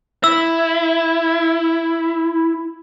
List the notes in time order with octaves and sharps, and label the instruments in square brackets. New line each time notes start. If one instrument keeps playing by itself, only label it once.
[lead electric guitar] E4 [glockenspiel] E6